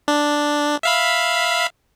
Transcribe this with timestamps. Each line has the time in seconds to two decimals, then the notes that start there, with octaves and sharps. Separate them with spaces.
0.08 D4
0.83 E5 F5 B5